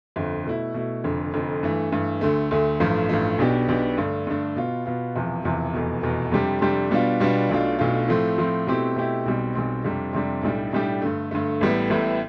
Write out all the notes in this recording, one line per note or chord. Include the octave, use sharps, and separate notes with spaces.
G1 F2 D3
B2 A3 E4
B2 A3 E4
F1 F2 D3
F1 F2 D3
G2 E3 A3
G2 E3 A3
D2 D3 A3
D2 D3 A3
A1 G2 F3 A3
A1 G2 F3 A3
B1 B2 B3 D4 G4
B1 B2 B3 D4 G4
G2 D3 A3 D4
G2 D3 A3 D4
B2 B3 F4
B2 B3 F4
E1 E2 C3 F3
E1 E2 C3 F3
F1 E2 B2
F1 E2 B2
F2 C3 G3 D4 G4
F2 C3 G3 D4 G4
B2 G3 B3 D4 F4
B2 G3 B3 D4 F4
B1 B2 A3 D4 F4
B1 B2 A3 D4 F4
A2 F3 A3 C4
A2 F3 A3 C4
B2 A3 C4 E4 G4
B2 A3 C4 E4 G4
B1 B2 G3 C4
B1 B2 G3 C4
F2 C3 G3 D4
F2 C3 G3 D4
B1 A2 G3 D4 G4
B1 A2 G3 D4 G4
G2 D3 A3
G2 D3 A3
A1 A2 G3 B3 E4
A1 A2 G3 B3 E4